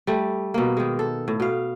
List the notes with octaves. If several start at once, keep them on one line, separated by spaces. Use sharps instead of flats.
G3 A3
B2 A#3
D#3 G#3
A4
A2
B2 F5